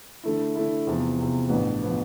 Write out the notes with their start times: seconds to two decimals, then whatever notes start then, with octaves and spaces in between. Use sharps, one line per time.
0.24 D3 A3 E4
0.55 D3 A3 E4
0.87 E2 C3 F3
1.19 E2 C3 F3
1.49 A1 G2 F3 B3
1.83 F3 B3